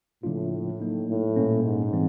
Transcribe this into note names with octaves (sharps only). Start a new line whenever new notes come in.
A2 C#3 F3 A#3 D4 F4
F#3 A#3 D#4
A2
A#2 G3 A#3 C#4
G#2
E3 G3 C4